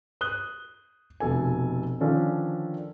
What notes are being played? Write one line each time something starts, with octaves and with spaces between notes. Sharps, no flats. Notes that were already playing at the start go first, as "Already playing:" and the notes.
D#6 F#6 G7
F1 B2 A4 G#5
D3 D#3 F3 C#4 D4 A4